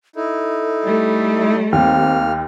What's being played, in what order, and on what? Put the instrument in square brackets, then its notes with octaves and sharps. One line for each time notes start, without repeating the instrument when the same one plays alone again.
[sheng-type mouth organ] D#4 E4 [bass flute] A4
[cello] G3 A3
[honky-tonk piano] D#2 [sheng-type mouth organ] A#3 F6 [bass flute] C4